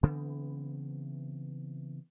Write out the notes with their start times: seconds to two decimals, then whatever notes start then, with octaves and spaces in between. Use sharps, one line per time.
0.03 C#3 E3 B3 C4